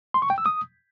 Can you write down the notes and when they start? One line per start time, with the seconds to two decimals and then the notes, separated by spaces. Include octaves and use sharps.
0.14 C6
0.22 C#6
0.30 G5
0.38 E6
0.46 D#6